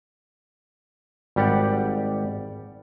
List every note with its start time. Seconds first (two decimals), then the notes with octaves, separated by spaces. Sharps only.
1.36 G#1 G3 G4 D5 F#5